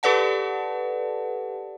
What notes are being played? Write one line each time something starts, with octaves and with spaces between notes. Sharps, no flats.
G4 A4 B4 D5 F#5 A5